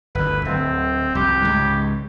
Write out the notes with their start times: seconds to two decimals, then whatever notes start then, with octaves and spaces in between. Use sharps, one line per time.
0.15 G1 D2 B4
0.45 D1 C4
1.15 C2 F2 G4
1.42 C#2 G#2